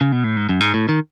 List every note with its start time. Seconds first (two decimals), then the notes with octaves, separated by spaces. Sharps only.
0.01 C#3
0.12 B2
0.24 A2
0.37 G#2
0.49 F#2
0.60 G#2
0.74 A2
0.89 D#3